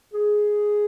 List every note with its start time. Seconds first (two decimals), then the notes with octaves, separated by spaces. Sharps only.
0.14 G#4